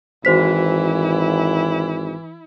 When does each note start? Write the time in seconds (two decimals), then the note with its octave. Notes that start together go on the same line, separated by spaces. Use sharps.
0.25 G#1 E3 E4 F#4 C5 B6